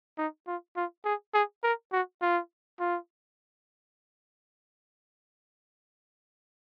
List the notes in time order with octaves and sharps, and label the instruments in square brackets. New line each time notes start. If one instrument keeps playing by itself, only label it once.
[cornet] D#4
F4
F4
G#4
G#4
A#4
F#4
F4
F4